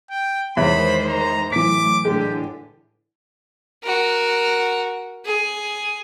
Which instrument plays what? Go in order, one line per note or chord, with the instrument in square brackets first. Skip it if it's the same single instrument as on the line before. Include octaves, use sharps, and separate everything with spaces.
[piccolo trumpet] G5
[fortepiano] E2 [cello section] D#3 G#3 C5 [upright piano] C#5 [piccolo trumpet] B5
[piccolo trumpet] A#5
[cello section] A2 F#3 [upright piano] E3 B6 [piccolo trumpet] D6
[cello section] A2 D3 [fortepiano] G#3 [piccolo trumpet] G4
[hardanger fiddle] F#4 A#4
G#4